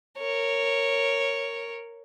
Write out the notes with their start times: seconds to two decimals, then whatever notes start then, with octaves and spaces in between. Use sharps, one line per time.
0.18 A#4 C#5